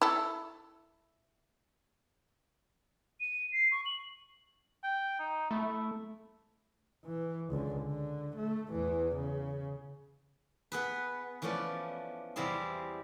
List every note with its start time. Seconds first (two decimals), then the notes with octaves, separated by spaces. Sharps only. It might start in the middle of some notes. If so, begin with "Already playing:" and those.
0.02 E4 A4
3.21 D#7
3.53 C7
3.72 C#6
3.86 F#7
4.83 G5
5.20 D#4
5.51 A3 E4
7.05 E3
7.50 C#2 D3
7.82 D3
8.36 A3
8.70 E2 E3
9.16 C#3
10.72 B3 G#4 B4
11.42 E3 F3 A3 C#4 D5
12.36 E2 C3 G3 C4 E4 G#4